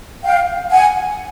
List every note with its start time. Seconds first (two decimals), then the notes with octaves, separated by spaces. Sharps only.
0.23 F5 G5
0.71 F#5 G#5